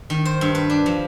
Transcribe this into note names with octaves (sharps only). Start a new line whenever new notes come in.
D#3
C5
G2
B4
D4
F3